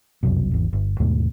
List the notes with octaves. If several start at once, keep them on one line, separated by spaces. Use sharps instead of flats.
F1 C2 F#2 B2
G#1 E2
G1
D#2 G#2 B2 A3